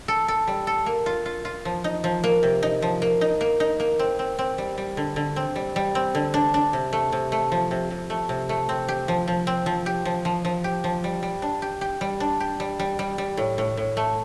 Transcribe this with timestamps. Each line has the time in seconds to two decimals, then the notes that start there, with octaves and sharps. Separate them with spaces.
0.08 A4
0.28 A4
0.48 G3
0.67 A4
0.86 A#3
1.06 F4
1.26 F4
1.45 F4
1.65 F3
1.84 D#4
2.04 F3
2.24 A#3
2.43 C3
2.63 D#4
2.82 F3
3.02 A#3
3.21 D#4
3.41 A#3
3.60 D#4
3.80 A#3
3.99 C4
4.19 C4
4.39 C4
4.58 G3
4.78 G3
4.97 D3
5.16 D3
5.36 C4
5.56 G3
5.76 G3
5.95 C4
6.15 D3
6.34 D4
6.54 D4
6.73 C3
6.93 A3
7.12 C3
7.32 A3
7.52 F3
7.71 C3
7.90 C3
8.10 A3
8.29 C3
8.49 A3
8.69 C4
8.89 G4
9.08 F3
9.28 F3
9.47 C4
9.66 F3
9.86 G4
10.05 F3
10.25 F3
10.45 F3
10.64 G4
10.84 F3
11.04 G3
11.23 G3
11.42 D4
11.62 G4
11.81 G4
12.01 G3
12.20 D4
12.40 G4
12.60 G3
12.79 G3
12.99 G3
13.18 G3
13.37 A2
13.58 A2
13.77 A2
13.97 A3